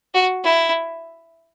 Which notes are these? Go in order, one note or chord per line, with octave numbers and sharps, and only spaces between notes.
F#4
E4